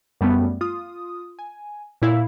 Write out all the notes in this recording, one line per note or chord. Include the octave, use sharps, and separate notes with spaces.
F#2 G3 A3 B3
F4 D#6
G#5
A#2 E4 F5